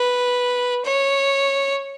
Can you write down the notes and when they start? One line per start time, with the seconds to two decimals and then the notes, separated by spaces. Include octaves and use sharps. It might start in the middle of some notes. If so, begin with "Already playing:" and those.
Already playing: B4
0.84 C#5